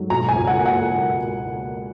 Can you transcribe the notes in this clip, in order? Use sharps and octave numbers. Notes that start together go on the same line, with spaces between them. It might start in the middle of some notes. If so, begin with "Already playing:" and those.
Already playing: G#2 F#3
B2 A#5
G#5
C#2
F#5
A#3
F#5